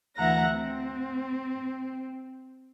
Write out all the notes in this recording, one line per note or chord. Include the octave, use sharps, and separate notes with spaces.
D2 E3 E5 F#5 A#5 A#6
C4